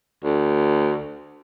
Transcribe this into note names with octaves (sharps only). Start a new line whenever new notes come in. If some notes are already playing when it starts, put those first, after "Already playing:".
D2